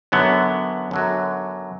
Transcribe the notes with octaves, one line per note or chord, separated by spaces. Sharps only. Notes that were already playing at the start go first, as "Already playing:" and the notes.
F#2 D3 F#3 B3
F#2 D3 F#3